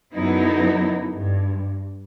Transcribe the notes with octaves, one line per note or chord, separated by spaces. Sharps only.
F#2 D3 F#3 B3 D#4 E4
G2